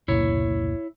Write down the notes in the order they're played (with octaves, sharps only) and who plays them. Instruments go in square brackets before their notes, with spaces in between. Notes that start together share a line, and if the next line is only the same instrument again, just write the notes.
[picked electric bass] F1 C#2 A#2 [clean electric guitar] E4 C#5